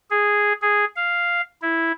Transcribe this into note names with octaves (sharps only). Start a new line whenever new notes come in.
G#4
G#4
F5
E4